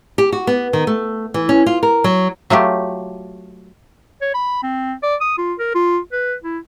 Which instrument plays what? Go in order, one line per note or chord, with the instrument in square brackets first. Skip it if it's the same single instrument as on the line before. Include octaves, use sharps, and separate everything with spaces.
[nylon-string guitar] G4
F#4
B3
D#3
A3
E3
C#4
F4
A#4
F#3
[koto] F#3 A3 F4 G4
[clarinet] C#5
B5
C4
D5
D#6
F4
A#4
F4
B4
E4